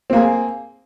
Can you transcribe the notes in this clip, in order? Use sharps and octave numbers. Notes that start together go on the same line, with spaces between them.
A#3 C4 G#4